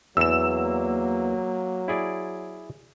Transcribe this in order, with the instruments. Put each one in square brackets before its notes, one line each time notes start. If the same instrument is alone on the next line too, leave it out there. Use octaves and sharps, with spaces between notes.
[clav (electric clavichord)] E2 [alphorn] F#3 [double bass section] A#3 [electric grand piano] E6 E7
[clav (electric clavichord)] E4 G#4 D5